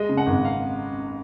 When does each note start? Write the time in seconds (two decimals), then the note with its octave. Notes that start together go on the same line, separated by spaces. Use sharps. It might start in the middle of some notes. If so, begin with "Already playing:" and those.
Already playing: G#3 D#5
0.09 C#3
0.17 F#5
0.26 G#1
0.45 F5